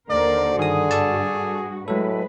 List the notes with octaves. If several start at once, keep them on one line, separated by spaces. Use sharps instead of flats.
D#2 D3 A#4 C5 D5
G2 D#3 F#4 G#4 D#6
A4 D5 A5
A2 F#3 G#3 A4 B4